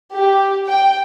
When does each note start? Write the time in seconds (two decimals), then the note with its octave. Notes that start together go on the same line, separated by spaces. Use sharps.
0.16 G4
0.68 G5